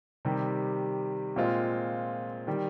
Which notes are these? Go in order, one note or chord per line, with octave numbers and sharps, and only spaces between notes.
C3 D#3 G3
A#2 G#3 C4 F4
D#3 G3